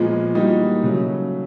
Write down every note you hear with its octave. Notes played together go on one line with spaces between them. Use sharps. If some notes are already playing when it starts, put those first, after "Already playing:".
Already playing: A#2 F3 G#3 B3
E3 G3 A#3 D#4 F#4
C#3 F#3 A3